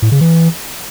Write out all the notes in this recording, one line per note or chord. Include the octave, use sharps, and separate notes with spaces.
A2
C#3
E3